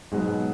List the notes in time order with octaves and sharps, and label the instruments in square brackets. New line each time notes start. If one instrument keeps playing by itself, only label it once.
[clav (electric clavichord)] G#2 G#3 [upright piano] B2 F#3 B3